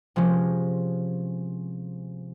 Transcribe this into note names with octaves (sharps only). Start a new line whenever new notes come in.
C3 F3 G#3 C#4